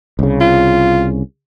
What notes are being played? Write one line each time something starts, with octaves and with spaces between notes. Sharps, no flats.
C2 C#3
F4